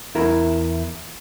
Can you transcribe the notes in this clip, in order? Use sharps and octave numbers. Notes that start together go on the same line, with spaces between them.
E2 E4 A#4